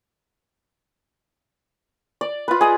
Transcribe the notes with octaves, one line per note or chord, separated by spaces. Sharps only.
D5
F4 B4
G#4 D#5